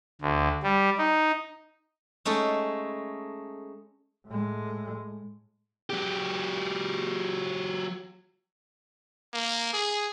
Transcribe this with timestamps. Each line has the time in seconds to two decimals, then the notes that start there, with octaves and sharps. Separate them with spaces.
0.21 D2
0.63 G3
0.98 D#4
2.25 G#3 A3 C#4 D#4 A4
4.27 A2 G#3
5.90 F#3 G4
9.33 A#3
9.73 G#4